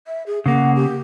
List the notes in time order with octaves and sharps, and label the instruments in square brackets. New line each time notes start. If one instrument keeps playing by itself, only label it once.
[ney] E5
G#4
[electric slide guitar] C#3 A#3 [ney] F#5
[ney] G4